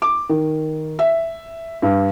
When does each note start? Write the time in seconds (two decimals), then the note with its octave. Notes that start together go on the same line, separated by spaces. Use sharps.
0.02 D6
0.29 D#3
0.99 E5
1.82 G2